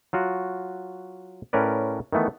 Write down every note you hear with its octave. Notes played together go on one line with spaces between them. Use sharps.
F#3 F4 F#4
A2 C#4 A#4 B4 D5
D#3 E3 A3 B3